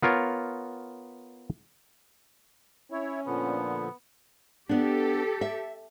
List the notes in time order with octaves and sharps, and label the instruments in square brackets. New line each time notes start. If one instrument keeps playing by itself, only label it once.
[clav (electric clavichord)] B3 F4 A#4 C#5
[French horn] C#4 [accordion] E4 C#5
[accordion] A#2 D3 F3 [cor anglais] B3
[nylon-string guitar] B3 D4 [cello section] G4 A4
[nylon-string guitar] E5